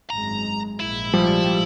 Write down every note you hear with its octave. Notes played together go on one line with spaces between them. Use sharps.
G#1 F#2 G#3 A#5
A#1 G#2 G#3 E4
F3 G3